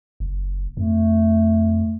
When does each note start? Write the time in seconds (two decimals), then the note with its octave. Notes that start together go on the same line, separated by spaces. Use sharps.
0.20 F#1
0.77 F2 A3